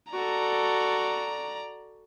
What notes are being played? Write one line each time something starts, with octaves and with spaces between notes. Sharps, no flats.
F#4 A4 D5 A#5